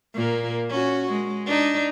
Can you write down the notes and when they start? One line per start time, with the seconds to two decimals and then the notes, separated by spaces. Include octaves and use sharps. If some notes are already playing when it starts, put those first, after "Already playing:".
0.14 A#2 A#3
0.69 C#4 F#4
1.12 G#3
1.46 D4 D#4